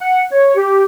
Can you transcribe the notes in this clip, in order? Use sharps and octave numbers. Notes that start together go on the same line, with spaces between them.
F#5
C#5
G4